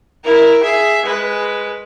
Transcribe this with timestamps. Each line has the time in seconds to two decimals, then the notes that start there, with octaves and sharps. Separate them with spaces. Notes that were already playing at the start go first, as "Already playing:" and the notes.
0.24 E4 A#4
0.63 G#4 E5
1.05 G#3 B4